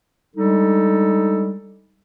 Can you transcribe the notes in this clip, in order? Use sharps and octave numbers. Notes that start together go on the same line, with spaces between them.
G3 G#3 D4 D#4 A4